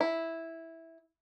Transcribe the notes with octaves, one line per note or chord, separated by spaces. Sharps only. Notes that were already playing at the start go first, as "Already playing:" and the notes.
E4